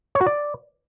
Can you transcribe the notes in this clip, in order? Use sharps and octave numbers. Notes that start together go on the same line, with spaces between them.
C#5
F#4
D5